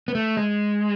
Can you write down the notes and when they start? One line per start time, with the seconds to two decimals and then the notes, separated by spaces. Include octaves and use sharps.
0.08 B3
0.15 A3
0.37 G#3